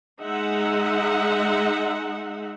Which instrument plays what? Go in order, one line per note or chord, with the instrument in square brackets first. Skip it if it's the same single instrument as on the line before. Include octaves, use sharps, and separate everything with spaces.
[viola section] G#3 D#4 E5 F#5